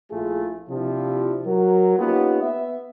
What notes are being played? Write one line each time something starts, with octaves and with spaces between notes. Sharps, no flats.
A#1 A3 E4 F4 G#4
C3 F3 D4 E4 F4 G4
F#3 F#4 A#4
A#3 B3 C#4 D#4 F4 G4
B3 E5